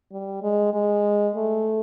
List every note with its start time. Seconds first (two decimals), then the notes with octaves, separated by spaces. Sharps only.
0.12 G3
0.43 G#3
0.74 G#3
1.35 A3